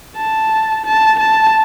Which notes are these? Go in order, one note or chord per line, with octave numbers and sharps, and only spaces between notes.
A5
A5
A5